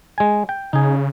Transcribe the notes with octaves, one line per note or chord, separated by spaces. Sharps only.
G#3 G#5
G5
C#3 D#4 G#4